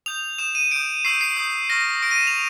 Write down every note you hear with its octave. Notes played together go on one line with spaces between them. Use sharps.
D#6 G6 F7
D#6 G6 E7
D#7
D#6 G6 D7
C#6 E6 G6 C7
C7
D#6 G6
C#6 F6 A#6
C#6 F6 D7
D#7
E7
F7